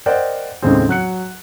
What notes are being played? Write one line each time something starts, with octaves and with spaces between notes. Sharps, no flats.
A#4 C5 D5 D#5 F#5 G5
D#2 A2 C#3 G#3 C4
F#3 F#6 C#7